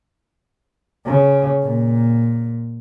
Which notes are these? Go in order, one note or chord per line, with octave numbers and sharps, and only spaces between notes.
C#3
A#2